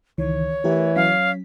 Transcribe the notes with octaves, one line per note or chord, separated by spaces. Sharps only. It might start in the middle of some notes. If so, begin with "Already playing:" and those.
C#2 D#3 E3 C#5
E3 A3 G4 A#4
F#3 C#4 F5 B6